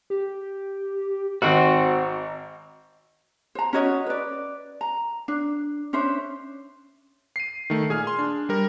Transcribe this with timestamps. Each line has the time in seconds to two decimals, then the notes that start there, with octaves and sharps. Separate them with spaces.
0.10 G4
1.42 G#1 C4 F#4 A#5
3.55 C5 A#5
3.73 C#4 F#4 C#5 D#5
4.07 B4 D5
4.81 A#5
5.28 D4
5.93 C#4 D4 C5 E5
7.36 C7 D#7
7.70 D#3 A3
7.89 A#2 G#4 G#5 F6
8.07 C6
8.19 D4
8.49 G3 A#4